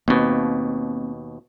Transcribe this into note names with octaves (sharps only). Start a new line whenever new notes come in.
D#2 B2 A#3 C4